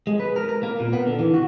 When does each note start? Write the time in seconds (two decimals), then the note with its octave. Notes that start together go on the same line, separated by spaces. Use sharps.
0.07 G#3
0.20 B4
0.36 A#4
0.49 A#4
0.63 A#3
0.80 A#2
0.93 B3
1.07 D3
1.19 E3
1.34 F#4